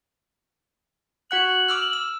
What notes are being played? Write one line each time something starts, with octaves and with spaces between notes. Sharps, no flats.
F#4 F#5 F#6 F#7
D6 E6 F6
E6